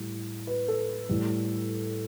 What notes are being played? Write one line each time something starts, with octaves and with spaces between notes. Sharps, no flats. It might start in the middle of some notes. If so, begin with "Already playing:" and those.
Already playing: A2 G3
B4
A4
A2 G3